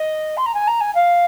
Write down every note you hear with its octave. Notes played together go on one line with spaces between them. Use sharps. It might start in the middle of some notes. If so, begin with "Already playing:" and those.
Already playing: D#5
C6
A#5
G#5
A#5
G#5
F5